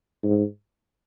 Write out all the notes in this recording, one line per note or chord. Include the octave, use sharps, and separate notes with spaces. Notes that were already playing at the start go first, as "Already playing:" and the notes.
G#2